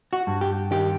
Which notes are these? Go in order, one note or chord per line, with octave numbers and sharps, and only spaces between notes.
F#4
G2
G4
D#3 G4